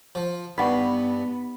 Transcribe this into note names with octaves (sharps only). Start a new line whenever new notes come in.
F3
G2 B3 D#4 F#5 B5 C#6